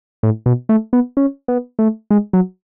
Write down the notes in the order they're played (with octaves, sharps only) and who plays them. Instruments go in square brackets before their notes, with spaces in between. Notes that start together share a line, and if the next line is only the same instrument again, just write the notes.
[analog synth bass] A2
B2
A3
B3
C#4
B3
A3
G#3
F#3